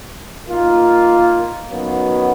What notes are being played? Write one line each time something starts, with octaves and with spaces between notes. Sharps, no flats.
D#3 A#3 F4
F#2 D#3 F#3 B3